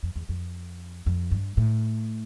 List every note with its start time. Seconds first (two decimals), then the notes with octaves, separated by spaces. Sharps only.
0.03 F2
0.16 E2
0.29 F2
1.06 F2
1.31 G2
1.57 A2